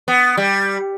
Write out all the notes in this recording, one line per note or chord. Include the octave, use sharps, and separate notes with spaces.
B3
G3